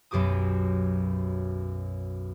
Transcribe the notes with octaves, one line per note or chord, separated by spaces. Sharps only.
B1 F#2 G4 D6 D#6